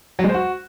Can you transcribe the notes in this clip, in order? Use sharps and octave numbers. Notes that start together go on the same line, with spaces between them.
F#3
G#3
C5
F#4